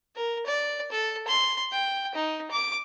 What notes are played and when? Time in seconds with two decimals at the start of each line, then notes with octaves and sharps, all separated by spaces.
0.16 A#4
0.46 D5
0.92 A4
1.28 C6
1.72 G5
2.15 D#4
2.51 D6